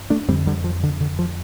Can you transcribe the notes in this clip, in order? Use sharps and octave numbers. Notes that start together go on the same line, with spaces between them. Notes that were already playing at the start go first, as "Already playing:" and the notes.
Already playing: G2
A3 D4
F2 D3 G3 C4
D3 G3
F3
D3
D3
F3